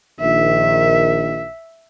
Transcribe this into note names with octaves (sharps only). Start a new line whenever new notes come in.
A#1 D#3 E5